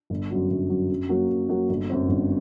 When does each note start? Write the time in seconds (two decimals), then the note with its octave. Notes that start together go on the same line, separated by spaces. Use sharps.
0.10 G1
0.30 F#2 F#3
0.50 G1
0.69 F#2 F#3
0.90 F#2
1.09 F#3 A#3 F#4
1.29 F#2
1.49 F#3 A#3 F#4
1.69 G1
1.90 F#2 F#3 C4
2.09 G1